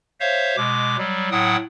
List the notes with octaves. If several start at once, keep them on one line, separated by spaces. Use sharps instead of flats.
C5 C#5 E5 F5
B2 G#3 D6
F#3 G3
A2 F#3 F#5 G5 D#6